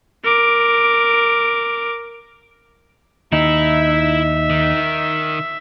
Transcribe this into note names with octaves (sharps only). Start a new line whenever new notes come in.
A#4 D6
D#2 D#4 E4 E5
D#3